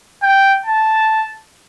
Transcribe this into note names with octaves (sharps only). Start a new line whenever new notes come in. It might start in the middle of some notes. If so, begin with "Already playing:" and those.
G5
A5